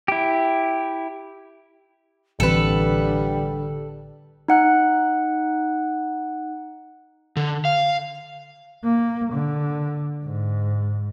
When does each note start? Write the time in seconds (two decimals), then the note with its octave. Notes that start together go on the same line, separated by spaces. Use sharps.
0.08 E4 G4
2.40 A1 D3 E3 G3 C4 A4 B4
4.48 D#4 F#5 F#6
7.37 D3
7.65 F5
8.84 A#3
9.34 D3
10.24 G#2